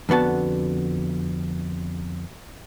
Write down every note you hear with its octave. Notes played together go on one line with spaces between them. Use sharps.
F2 D3 B3 F#4 A5